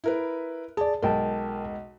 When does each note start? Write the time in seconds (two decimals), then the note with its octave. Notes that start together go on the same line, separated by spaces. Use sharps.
0.04 E4 A#4 B4
0.77 G#4 D5 A5
1.03 B1 G#3 A#4 G5 A5